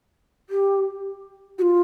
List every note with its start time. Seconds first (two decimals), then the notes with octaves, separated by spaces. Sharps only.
0.50 G4
1.58 F#4
1.62 F4